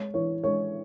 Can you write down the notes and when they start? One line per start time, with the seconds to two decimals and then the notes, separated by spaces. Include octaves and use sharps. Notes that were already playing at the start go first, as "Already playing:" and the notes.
Already playing: G#3 C#5
0.14 E3 C#5
0.44 G#3 C#5